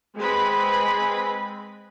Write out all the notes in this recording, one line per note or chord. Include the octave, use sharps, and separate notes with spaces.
G#3 C4 G#4 B4 B5